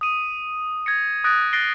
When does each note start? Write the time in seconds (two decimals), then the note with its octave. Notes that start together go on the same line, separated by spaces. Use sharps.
0.01 D#6 D#7
0.86 G#6 A#6 C#7
1.24 D#6 F#6 A6 A#6 D7
1.53 F#6 A6 A#6 C7 D7 G7